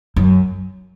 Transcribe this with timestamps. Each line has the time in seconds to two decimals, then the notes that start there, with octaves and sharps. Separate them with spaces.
0.16 F#2